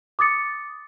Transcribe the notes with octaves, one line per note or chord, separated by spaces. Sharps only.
D6 D#6 A6 C#7